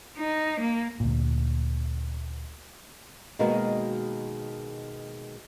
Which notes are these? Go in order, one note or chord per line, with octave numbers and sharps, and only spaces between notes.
D#4
A#3
D2 A#2
B2 D#3 G#3 A#3 F#4 A#4